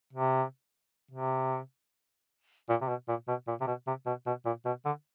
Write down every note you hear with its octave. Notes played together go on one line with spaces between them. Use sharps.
C3
C3
A#2
C3
B2
A#2
B2
A#2
C3
B2
C3
B2
B2
A#2
B2
D3